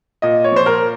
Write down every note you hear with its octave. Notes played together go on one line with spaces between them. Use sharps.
A#2 D#5
C#5
F3 C5
A#4